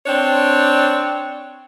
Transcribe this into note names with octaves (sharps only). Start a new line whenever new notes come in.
C4 D4 C#5